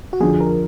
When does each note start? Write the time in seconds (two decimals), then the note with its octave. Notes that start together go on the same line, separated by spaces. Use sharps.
0.13 F#4
0.20 F2 D3 F3 G#4
0.40 A#4